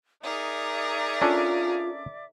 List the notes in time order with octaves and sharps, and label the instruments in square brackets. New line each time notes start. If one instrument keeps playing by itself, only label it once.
[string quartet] D#4 G#4 A#4 [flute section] D5 E5 D6
[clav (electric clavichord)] C#4 D4 A4 [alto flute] F4